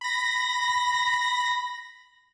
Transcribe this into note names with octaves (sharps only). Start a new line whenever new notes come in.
B5 A#6